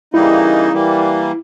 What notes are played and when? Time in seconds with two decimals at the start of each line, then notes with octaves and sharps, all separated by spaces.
0.14 C#3 E3 G3 A#3 D#4 E4
0.73 E3 G3 A#3